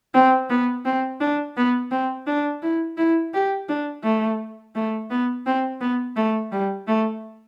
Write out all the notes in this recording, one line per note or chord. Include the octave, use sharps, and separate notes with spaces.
C4
B3
C4
D4
B3
C4
D4
E4
E4
G4
D4
A3
A3
B3
C4
B3
A3
G3
A3